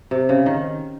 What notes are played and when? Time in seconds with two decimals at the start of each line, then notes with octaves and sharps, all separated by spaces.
0.11 C3
0.29 C#3
0.46 D#3